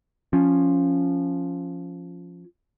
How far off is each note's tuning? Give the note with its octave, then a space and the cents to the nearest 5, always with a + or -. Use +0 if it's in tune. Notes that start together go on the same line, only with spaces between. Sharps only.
F3 +0 C#4 +0